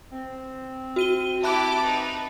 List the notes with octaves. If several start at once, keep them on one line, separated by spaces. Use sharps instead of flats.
C4
F#4 D#7 G7
E4 G4 E5 A5 B5 D6 F#6
D#4 B4